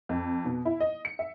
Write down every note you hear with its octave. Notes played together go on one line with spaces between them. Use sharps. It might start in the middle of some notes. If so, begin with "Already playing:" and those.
F2
B2
E4
D#5
C#7
E5